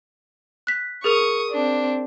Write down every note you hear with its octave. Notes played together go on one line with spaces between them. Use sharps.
F#6 B6
G#4 A#4 C#6 D#6 F7
C4 D4